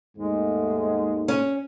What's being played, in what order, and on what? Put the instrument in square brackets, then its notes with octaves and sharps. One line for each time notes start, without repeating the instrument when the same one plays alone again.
[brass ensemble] D#2 G#2 A3 [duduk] G#3
[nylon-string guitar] C#4